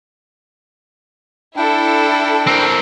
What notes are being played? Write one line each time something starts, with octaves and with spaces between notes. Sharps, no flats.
D4 E4 A4 G5
C4 A#4